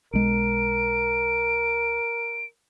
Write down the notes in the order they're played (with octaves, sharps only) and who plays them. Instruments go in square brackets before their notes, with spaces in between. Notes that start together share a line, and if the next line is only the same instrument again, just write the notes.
[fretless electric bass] B1 G#3 [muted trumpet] A#4 [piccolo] D7